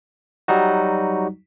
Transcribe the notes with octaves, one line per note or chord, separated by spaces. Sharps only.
F#3 G3 D#4 F#4